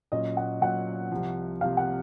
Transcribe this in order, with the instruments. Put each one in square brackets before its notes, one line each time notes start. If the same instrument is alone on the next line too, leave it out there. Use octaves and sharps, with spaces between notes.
[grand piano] A#2 F#3 C#4 [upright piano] D#5
[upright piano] F#5
[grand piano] A#2 F#3 C#4 [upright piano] F#5
[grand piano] C2 C3 F3
[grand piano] C2 C3 F3 [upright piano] F5
[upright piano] F#5